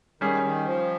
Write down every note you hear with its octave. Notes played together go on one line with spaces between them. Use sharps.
D#3 G3 C#4 G#4
D#3
F3